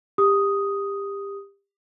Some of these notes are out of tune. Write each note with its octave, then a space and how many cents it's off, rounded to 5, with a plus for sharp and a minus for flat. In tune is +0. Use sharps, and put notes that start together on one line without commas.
G4 +25 D#6 +0